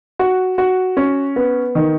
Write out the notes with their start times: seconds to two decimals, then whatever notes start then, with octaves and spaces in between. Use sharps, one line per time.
0.19 F#4
0.58 F#4
0.97 C#4
1.36 B3
1.75 D#3